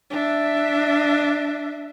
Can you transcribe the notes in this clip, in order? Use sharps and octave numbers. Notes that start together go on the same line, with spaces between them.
D4 E5